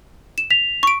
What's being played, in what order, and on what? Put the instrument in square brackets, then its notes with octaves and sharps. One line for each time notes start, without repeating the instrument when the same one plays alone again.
[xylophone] E7
[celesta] B6 F7
[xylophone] C#6 D7